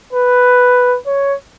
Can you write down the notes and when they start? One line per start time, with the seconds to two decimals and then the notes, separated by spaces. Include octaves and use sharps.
0.13 B4
1.06 C#5